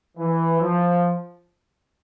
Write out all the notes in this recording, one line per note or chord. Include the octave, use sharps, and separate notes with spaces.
E3
F3